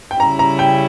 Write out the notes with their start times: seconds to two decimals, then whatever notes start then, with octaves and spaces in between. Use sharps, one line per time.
0.11 G5
0.19 C#3 G3 C#4 E4 A#5
0.39 A#5
0.59 G5